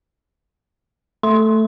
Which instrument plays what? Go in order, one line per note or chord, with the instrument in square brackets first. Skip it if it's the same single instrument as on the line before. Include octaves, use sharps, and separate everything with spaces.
[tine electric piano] A3 [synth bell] C6